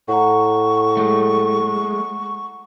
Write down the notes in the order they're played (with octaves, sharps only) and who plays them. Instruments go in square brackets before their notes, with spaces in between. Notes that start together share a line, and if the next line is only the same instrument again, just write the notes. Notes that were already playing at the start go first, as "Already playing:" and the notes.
[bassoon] A2 [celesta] F#5 A#5 [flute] C#6
[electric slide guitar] G#3 A3